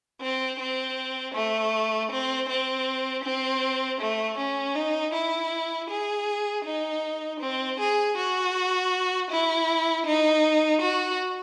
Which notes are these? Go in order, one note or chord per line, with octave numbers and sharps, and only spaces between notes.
C4
C4
A3
C4
C4
C4
A3
C#4
D#4
E4
G#4
D#4
C4
G#4
F#4
E4
D#4
F#4